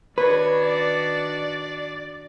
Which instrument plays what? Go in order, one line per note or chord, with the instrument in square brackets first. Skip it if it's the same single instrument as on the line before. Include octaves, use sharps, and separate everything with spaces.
[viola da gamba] D#3 D4 F#4 [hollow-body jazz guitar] B4 [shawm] C#5
[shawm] D5